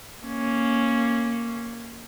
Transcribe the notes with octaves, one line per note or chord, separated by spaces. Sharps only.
A#3 C#4